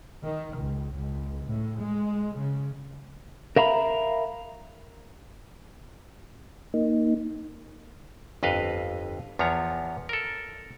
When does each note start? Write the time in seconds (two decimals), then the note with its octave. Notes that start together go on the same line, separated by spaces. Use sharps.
0.23 D#3
0.53 C#2
0.94 C#2
1.44 A2
1.79 G#3
2.37 C#3
3.56 A#4 E5 F5 A#5 B5
6.74 A#3 D#4
8.43 G1 F2 B4 D#5 F5
9.39 E2 F3 B3 C#5 A#5
10.09 A4 A#4